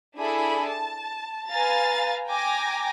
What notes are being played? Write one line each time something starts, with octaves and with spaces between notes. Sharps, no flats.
D4 E4 G#4 A4 B5
A5
B4 F5 G#5 A#5 A6
G5 G#5 A#5 D6 A#6